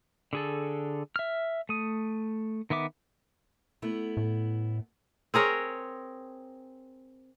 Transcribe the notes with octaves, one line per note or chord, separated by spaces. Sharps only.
D3 G#4 A4
E5 F6
A3 D#6
D#3 B3 E5 D6
A3 B3 E4
A2
C4 G#4 A#4 C#5